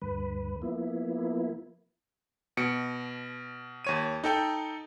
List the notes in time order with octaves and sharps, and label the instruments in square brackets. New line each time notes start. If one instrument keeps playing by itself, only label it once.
[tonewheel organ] D2 G2 B4
F3 A#3 B3 E4
[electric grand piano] B2 C#7 D7
D#2 C#5 D#7
D#4 A4 G5